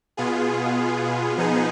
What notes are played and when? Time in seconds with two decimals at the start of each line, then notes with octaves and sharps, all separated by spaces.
0.17 B2 B3 F4 G#4
1.37 F3 B3 D#4 G#4